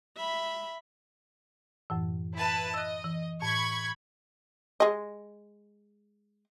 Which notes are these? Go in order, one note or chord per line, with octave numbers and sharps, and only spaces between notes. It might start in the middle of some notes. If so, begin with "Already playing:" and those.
E5 B5
F#2 A2 E3
E4 B4 A5
D#5 E6 F#6
E3
A2 B5 C#6 G#6
G#3 D#5